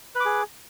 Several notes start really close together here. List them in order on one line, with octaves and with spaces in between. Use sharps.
B4 D6 G#4